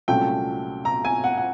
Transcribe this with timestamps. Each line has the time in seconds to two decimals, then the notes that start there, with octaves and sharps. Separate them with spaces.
0.08 C2 A#2 F#3 A3 C#4 G5
0.85 A#5
1.05 G#5
1.24 F#5
1.37 F#5